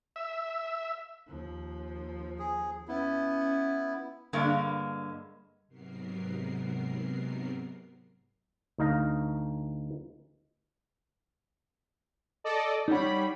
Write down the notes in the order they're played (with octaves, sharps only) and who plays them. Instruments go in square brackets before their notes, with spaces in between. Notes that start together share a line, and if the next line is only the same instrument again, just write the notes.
[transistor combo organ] E5
[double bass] D#2 F3
[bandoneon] G#4
[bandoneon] B3 E4 [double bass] C#4
[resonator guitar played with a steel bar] G2 D3 G#3 A#3
[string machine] G#2 C3 F#3 B3 A#4 C7
[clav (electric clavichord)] D2 D#4 F5 A#5
[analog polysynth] A4 D5 D#5
[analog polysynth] G3 C#5 B5 [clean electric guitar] D#4 F#5